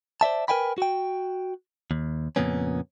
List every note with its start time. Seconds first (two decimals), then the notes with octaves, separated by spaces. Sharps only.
0.21 C5 D5 E5 A5
0.48 A#4 B4 E5 G5 G#5 B5
0.78 F#4 G5
1.91 D#2
2.36 F2 A#2 C#3 A#3 B3 C#4